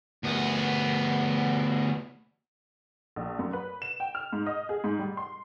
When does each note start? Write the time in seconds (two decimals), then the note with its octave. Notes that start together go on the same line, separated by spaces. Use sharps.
0.24 D2 B3
3.16 A#1
3.39 F#2
3.53 B4
3.82 E7
4.00 G5
4.15 F6
4.33 G#2
4.46 D#5
4.69 G#4
4.84 G#2
4.99 G3
5.17 C6